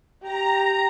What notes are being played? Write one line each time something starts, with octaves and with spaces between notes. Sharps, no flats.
G4 A#5